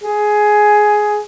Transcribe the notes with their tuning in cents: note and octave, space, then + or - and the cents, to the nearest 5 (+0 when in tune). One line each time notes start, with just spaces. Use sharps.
G#4 +10